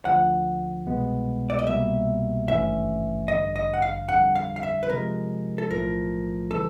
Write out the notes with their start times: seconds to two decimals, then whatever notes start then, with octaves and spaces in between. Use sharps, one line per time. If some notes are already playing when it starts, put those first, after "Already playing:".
0.05 D2 D3 F3 F#5
0.87 C2 B2 G#3 B3
1.50 D5
1.59 D#5
1.67 C2 B2 G3 A#3 E5
2.48 G#1 G2 E3 A3 C#4 E5
3.28 A1 G2 D3 D#5
3.56 D#5
3.74 F#5
3.82 F5
4.09 F2 D3 G3 F#5
4.35 F5
4.56 F5
4.63 E5
4.83 B4
4.89 C3 F3 G#3 A#4
5.58 A4
5.70 B1 A2 F3 A3 A#4
6.51 C#3 E3 G3 A4